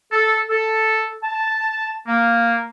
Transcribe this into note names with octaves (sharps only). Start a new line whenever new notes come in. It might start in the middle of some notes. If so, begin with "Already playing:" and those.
A4
A4
A5
A#3